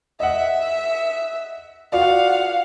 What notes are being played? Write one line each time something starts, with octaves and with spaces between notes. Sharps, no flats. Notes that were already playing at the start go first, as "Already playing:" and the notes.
D#5 E5 F#5
F4 F#4 D5 F5 F#5